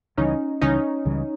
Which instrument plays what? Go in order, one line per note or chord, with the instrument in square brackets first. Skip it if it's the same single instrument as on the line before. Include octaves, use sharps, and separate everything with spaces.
[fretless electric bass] C#2 C#3 E3 G3 [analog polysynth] C#4 D#4
[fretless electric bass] C#2 C#3 E3 G3 [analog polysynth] C#4 D#4
[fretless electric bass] C#2 C#3 E3 G3